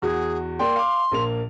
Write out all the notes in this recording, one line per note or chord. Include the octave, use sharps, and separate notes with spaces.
E2 F#4 G#4
A#3 D5 G5 C6
F5 D6
A#1 A#3 F7